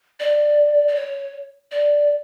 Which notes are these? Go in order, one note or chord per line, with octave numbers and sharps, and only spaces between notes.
D5
D5
C#5
D5